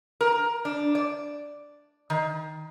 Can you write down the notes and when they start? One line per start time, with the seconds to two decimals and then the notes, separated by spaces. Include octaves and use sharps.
0.21 A#4
0.65 D4
0.95 D5
2.10 D#3